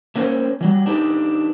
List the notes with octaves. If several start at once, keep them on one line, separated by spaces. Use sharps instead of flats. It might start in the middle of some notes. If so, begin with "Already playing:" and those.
A3 A#3 C#4 F#4 C5 C#5
E3 F#3 G3
D4 D#4 G4 A4 B4